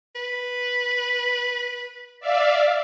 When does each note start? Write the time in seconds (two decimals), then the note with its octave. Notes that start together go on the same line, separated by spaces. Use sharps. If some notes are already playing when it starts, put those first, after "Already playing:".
0.15 B4
2.20 D5 E5 F5